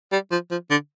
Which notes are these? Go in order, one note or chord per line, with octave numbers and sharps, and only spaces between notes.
G3
F3
F3
D3